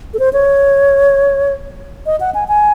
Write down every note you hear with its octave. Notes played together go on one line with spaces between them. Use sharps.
A4
C5
C#5
D#5
F#5
G#5
G#5